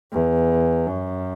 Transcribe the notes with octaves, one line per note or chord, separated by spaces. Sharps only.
E2
F#2